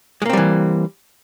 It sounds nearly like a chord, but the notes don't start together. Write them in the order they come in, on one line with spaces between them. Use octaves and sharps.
G#3 A#3 C4 G3 E3